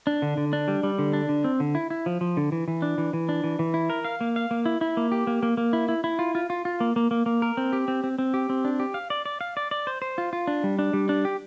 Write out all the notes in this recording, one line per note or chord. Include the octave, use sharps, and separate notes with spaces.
D4
D3
D3
D4
G3
G3
D3
D4
D3
C4
D3
E4
E4
F3
F3
D3
E3
E3
D4
E3
E3
D4
E3
E3
E4
A#4
F5
A#3
F5
A#3
E4
E4
A#3
G4
A#3
A#3
A#3
E4
E4
E4
F4
F4
F4
F4
A#3
A#3
A#3
A#3
A#4
C4
G4
C4
C4
C4
G4
C4
D4
G4
F5
D5
D5
F5
D5
D5
C5
C5
F4
F4
D4
G3
D4
G3
D4
G4